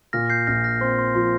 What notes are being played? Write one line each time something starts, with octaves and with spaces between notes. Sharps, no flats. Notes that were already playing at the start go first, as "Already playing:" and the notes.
A#2 F6 A#6
G6 C7
A#1 F6 A#6
F6 A#6
C4 C6
C6
F3 C6